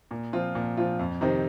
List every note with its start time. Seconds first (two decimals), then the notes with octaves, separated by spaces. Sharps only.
0.11 A#2
0.33 F3 C4 F4
0.55 A#2
0.77 F3 C4 F4
0.99 F2
1.21 C3 D#3 C4 D#4